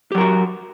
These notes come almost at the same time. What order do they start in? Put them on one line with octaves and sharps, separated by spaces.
G4 F#3 A#4 F#4